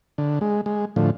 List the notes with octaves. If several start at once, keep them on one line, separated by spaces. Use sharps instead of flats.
D3
G#3
G#3
A2 D3 F3